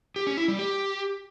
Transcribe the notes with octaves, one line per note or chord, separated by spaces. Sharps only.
G4
C#4
E4
G3
G4